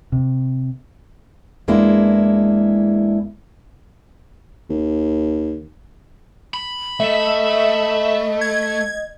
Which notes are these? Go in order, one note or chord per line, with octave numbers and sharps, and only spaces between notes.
C3
E2 G#3 A#3 D4 E4
D#2
B5
A3 D#5 E5
G#6